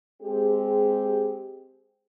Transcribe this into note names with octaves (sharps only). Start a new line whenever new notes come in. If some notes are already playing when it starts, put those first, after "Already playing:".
G#3 C4 G4 G#4